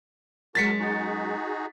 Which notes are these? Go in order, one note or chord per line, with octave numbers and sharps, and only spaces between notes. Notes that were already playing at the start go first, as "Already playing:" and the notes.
F#2 G#3 F#4 A#4 A5 A6 B6 C#7
D#4 F#4 G#4